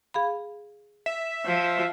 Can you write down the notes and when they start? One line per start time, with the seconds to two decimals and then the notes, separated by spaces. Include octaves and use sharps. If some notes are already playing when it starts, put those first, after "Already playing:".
0.14 G#4 F5 B5
1.06 E5
1.45 F3